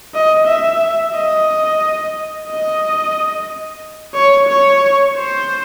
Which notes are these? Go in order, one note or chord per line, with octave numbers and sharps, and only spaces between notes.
D#5
E5
D#5
D#5
C#5
C#5
C5